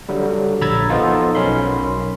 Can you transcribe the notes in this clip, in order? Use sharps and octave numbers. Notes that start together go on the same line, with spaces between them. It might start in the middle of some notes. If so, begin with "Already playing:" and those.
D3 F#3 G3
A#1 A#5 B5 E6 G#6 A6
F3 B3 D#4 F4 A4
B1 F#3 C#4 A#4 B5 C6